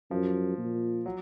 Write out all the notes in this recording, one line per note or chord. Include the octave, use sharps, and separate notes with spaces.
F#2 F3
A#2
F#3